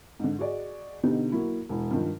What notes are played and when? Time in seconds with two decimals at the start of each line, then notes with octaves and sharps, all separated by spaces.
0.20 G#2 D3
0.39 F#4 G#4 D5 D#5
1.03 B2 D3 B3 D#4 G4
1.32 F#3 A#3 E4
1.69 E1 E4
1.91 G2 D#3 F3